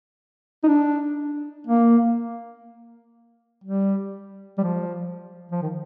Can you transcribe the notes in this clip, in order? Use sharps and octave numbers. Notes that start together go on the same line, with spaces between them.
D#4
D4
A#3
G3
G3
F3
F3
D#3